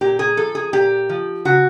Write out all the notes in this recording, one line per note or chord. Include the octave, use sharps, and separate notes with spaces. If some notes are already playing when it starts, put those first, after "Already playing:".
A#2 G4
G#4
F3 A4
G#4
A#2 G4
F3
C#3 F#4